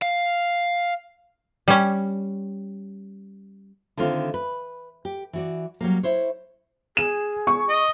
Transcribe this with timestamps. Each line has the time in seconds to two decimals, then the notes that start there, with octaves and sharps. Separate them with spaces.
0.02 F5
1.68 G3 C#4
3.97 D3 D#3 A3 C4 F4
4.34 B4
5.05 G4
5.33 E3 F#4 D5
5.81 F#3 G3 A#3
6.03 E4 C5 C#5
6.97 G#4 E7
7.47 C#6
7.69 D#5